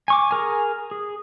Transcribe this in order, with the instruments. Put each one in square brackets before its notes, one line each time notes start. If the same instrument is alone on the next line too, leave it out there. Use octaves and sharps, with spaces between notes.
[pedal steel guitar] G#5 C#6 D6
G#4 A#4 G#5
G#4